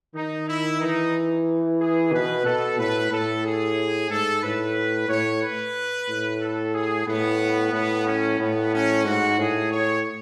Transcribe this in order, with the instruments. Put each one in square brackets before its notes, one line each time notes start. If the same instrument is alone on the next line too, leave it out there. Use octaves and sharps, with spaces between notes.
[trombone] D#3 [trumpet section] D#4
[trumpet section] E4
[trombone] E3 [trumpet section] D#4
[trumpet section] G#4
[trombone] B2 [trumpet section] B4
[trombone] B2 [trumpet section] A4
[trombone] A2 [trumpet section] B4
[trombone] A2 [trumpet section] A4
[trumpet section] G#4
[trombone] G#2 [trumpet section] A4
[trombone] A2 [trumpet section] B4
[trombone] A2 [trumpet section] C#5
[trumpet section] B4
[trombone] A2
[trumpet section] A4
G#4
[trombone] A2 [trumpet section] B3
[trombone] A2 [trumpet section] B3
[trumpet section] C#4
[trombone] A2 [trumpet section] B3
[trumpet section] C#4
[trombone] G#2 [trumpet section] F#4
[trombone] A2 [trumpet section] G#4
[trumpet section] C#5